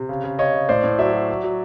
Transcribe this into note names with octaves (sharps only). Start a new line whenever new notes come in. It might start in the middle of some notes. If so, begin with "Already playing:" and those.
Already playing: C3
C#3
C#3
C#3 C#5 D#5
C#3
A2 C5 D5
A2
F#3 D5 E5
F#3
F#3
F#3